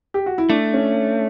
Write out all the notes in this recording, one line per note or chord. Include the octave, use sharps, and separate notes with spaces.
G4
F#4
E4
A3 D4
C#4